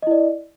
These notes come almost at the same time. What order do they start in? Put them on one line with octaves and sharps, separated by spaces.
D#5 E4 D5